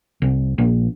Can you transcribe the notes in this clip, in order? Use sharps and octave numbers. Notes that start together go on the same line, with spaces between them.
C2
A#1